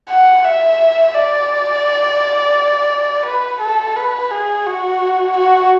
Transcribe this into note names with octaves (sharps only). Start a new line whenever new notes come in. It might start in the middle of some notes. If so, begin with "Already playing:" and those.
F#5
E5
D5
B4
A4
B4
G#4
F#4
F#4